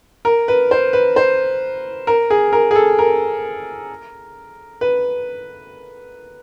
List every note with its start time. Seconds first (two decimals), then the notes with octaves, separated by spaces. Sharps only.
0.25 A#4
0.48 B4
0.71 C5
0.93 B4
1.16 C5
2.07 A#4
2.30 G#4
2.53 A#4
2.71 G#4
2.76 A4
2.99 A#4
4.81 B4